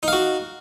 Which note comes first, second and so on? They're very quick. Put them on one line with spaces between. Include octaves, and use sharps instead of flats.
D#4 F5 F#4